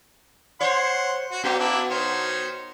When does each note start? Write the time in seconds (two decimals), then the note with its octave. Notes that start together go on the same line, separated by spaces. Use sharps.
0.61 C5 C#5 F#5 C6
1.32 F#4
1.43 G3 A#3 B3 F#4
1.59 A#3 D4 E4
1.90 D#3 C5 C#5